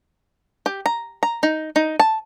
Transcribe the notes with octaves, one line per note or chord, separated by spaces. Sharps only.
G4
A#5
A#5
D#4
D#4
A5